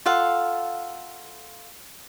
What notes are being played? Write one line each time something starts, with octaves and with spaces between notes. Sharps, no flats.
F4 A4 F5 F#5